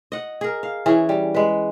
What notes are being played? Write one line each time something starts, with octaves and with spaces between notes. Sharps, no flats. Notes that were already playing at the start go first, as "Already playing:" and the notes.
D#5 F#5
G#4 A#4
F5
E3 C#4 G#4
G3
G#3 B4